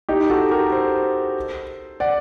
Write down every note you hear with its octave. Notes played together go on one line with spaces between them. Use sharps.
D#4 G4
F#4 A4
G4 A#4
A4 C5
D5 F#5